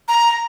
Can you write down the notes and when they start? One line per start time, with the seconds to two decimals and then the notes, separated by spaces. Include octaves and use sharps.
0.08 A#5